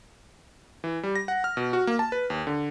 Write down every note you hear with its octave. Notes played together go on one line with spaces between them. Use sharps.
E3
G3
A#6
F#5
F6
B2
F#4
A#3
A5
B4
D#2
D3